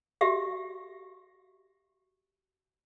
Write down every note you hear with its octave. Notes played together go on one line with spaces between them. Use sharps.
F#4 G4 E5